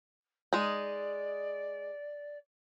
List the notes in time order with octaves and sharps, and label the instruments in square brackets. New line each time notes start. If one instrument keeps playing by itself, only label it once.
[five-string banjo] G#3 D#4 [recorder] D5